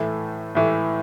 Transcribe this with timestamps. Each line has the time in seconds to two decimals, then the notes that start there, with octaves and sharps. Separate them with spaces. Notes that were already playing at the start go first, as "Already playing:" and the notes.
Already playing: A2 E3 A3
0.55 A2 E3 A3